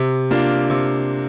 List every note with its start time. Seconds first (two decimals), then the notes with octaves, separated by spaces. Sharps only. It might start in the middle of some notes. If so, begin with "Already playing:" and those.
Already playing: C3
0.31 A#3 D4 F4
0.70 C3